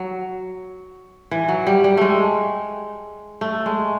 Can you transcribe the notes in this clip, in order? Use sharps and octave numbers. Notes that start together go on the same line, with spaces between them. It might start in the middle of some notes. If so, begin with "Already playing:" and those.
Already playing: F#3
E3
F#3
G3
G3
G#3 A3
A3
G#3